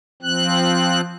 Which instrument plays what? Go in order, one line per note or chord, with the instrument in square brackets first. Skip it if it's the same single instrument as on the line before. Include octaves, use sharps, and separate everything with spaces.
[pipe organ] F3 C4 F#6